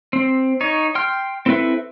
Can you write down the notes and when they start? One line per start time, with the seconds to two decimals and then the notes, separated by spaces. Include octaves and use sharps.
0.13 C4
0.61 D#4 C#5
0.95 G5 C6 F6
1.46 C4 E4 A4 B4 E5